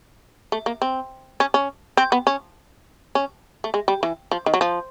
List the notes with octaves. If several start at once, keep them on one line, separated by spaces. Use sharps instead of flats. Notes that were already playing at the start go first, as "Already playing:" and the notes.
A3
A#3
C4
C#4
C#4
C4
B3
C#4
C#4
A3
G#3
G3
E3
F3
D#3
F#3
F3